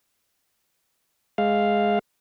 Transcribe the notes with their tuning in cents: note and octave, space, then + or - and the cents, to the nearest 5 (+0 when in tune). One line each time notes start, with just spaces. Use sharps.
G#3 +0 F5 +0